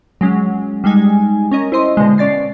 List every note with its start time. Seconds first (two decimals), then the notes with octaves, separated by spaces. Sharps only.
0.21 F#3 G#3 C#4
0.84 G3 G#3 D#4 G#5
1.51 C#4 A#4 D#5
1.72 E4 C5 D#5 C6
1.97 B2 D3 G#3
2.18 B2 C#4 D5 A6 C7